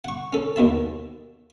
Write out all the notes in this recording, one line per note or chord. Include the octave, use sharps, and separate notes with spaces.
F#5 C#6
C#4 A4
D#2 B2 E5 A5